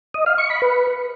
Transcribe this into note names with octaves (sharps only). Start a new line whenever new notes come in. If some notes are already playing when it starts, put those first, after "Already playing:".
D#5
F5
C#6
B5
B4